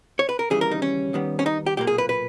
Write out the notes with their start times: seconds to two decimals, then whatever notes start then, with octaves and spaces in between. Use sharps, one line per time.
0.19 C#5
0.29 B4
0.39 A#4
0.50 D#2 C#3 E3 G3 G#4
0.61 A#4
0.71 D#4
0.82 C#4
1.13 D#2 D#3 G3 B3
1.39 C#4
1.46 D#4
1.66 G4
1.77 B1 A#2 A#3 G4
1.87 G#4
1.98 B4
2.09 B4